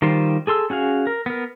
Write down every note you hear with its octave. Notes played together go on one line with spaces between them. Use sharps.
D#3 G3 F4 C5
G#4 A4 C6 E6
C#4 F#4 G#4 F5
A#4
B3 A#4